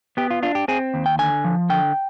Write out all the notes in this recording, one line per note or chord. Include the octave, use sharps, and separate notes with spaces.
B3 G4
F4
D4 F4
G4
C4 G#4
D#2
G5
D3 G#5
F3
D3 G5